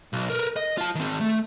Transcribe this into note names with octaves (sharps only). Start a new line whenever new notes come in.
B1
A#4 B4
D#5
F4 A5
D#3 C4
A3